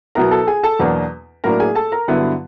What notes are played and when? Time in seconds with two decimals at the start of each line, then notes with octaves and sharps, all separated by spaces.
0.15 B2 F#3 B3 E4 A#4 A#5
0.31 A4 A5
0.47 G#4 G#5
0.63 A4 A5
0.79 E2 B2 F#3 A#3 D4
1.44 A2 F#3 A#3 D4 A#4 A#5
1.60 G#4 G#5
1.75 A4 A5
1.92 A#4 A#5
2.08 G2 D3 F#3 B3 E4